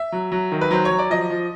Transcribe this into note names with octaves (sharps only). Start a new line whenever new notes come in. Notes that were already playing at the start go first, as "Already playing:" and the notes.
Already playing: E5
F#3
F#3
D#3
B4
F#3 C5
C#5
F#3
D5
F3 D#5
F3